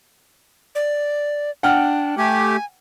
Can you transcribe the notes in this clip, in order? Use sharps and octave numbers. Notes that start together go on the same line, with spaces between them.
D5
D4 F#5 G5 F6
A3 G4 G#5